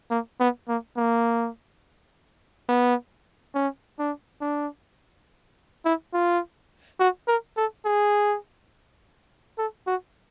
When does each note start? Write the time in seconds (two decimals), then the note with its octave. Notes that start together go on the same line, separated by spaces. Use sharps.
0.10 A#3
0.40 B3
0.68 A#3
0.97 A#3
2.69 B3
3.54 C#4
3.99 D4
4.41 D4
5.85 E4
6.13 F4
7.00 F#4
7.28 A#4
7.57 A4
7.85 G#4
9.58 A4
9.87 F#4